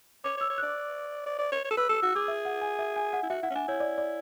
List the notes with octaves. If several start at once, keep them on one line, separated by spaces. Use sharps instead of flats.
C#5 D6
C#5 E6
C#5
D5 F#6
D5
D5
C#5
C#5
A4
B4 E6
A4 E6
F#4 E6
G#4 D6
E5
F#5
G#5
E5
G#5
F#5
E4
F#4 E5
E4 F#5
C#4
D4 G#5
E4 C#5
D5
D5